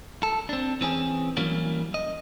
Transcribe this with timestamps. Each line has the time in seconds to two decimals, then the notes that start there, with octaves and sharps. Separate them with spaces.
0.23 A4
0.49 C4 D4
0.81 E3 C4 C#4 G#4
1.37 E3 F#3 G3 A#3 C#4
1.94 D#5